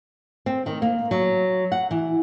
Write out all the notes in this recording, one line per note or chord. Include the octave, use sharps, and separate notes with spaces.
C4
D#3
A#3
F#3
F#5
E3